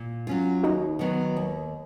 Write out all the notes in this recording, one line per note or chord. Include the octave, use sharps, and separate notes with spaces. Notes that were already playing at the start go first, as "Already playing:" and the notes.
Already playing: A#2
F#3 C#4 F4
D#2 D#4 F#4
D#3 F#3 B3
D#2